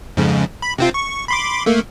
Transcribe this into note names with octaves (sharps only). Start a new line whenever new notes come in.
F2 G#2 C#3
B5
C3 C4 F4
C#6
B5 C6 D6
A3 A#3